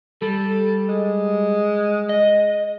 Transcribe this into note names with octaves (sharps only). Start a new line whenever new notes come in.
G3 A4
G#3
D#5